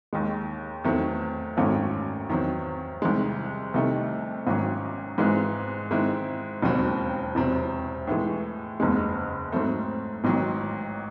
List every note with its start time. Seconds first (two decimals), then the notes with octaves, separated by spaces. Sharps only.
0.13 D#2 D#3 G#3
0.84 E2 D#3 F#3 A3 C4
1.57 G#1 F#2 D#3 A3 C#4
2.29 E2 D#3 F#3 C4
3.02 C2 C3 D#3 G#3
3.74 C2 C3 D#3 A3 D#4
4.47 G#1 G#2 D#3 F#3 C#4
5.18 G#1 G#2 E3 G#3 C4
5.91 G#2 D#3 G#3 C4 E4
6.62 E1 D#2 C#3 F#3 C4
7.35 E1 E2 C3 F#3 C4
8.07 A2 E3 G#3
8.80 F#1 E2 C#3 G#3
9.52 G#2 F#3 A3 C4
10.24 A1 G#2 D#3 F#3